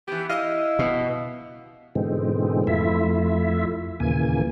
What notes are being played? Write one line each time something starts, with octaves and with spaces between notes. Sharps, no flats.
E3 B3 G4
E4 D#5 F5
B2
G#2 B2 D3 E3 G#3 C4
F2 A3 E4 F4 E5
D#2 A#2 C#3 E3 A#3 G#5